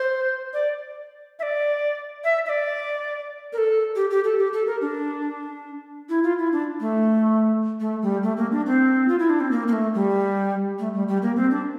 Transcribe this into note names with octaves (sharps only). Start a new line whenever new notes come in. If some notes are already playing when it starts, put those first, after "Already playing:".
Already playing: C5
D5
E5
D5
E5
E5
D5
A#4
A4
G4
G4
A4
G4
A4
A#4
D4
E4
F4
E4
D4
A3
A3
G3
A3
A#3
D4
C4
F4
E4
D4
C4
A#3
A#3
A3
G3
A3
G3
G3
A#3
C4
D4